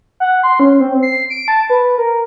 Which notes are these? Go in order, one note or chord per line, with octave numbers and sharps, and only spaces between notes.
F#5
C6
C#4
C4
C7
D7
A5
B4
A#4